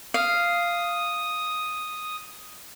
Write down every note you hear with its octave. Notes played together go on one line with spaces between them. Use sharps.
F5 D#6